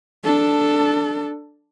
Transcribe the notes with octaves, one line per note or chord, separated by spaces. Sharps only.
D4 A4